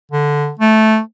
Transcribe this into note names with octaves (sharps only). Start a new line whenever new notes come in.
D3
A3